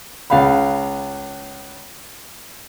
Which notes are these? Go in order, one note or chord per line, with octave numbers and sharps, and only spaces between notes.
C#2 F5 F#5 B5